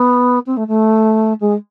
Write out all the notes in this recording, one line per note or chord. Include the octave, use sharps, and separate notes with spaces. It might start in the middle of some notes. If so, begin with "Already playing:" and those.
Already playing: B3
C4
A3
A3
G#3